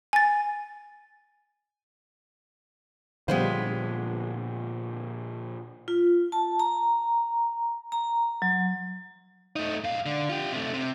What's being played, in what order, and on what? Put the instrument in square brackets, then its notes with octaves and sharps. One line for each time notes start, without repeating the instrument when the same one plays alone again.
[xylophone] G#5 A6
[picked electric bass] A#2 D3 F3 [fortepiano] G3 C5 [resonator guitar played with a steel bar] G#3 B3 F4
[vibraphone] F4
A5
A#5
A#5
F#3
[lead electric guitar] A3 D#4
G#2 F5
D3
F4 G4
C3 A3
C3